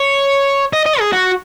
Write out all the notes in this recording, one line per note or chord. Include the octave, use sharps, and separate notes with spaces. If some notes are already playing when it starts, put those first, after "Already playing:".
Already playing: C#5
D#5
D#5
G#4
F#4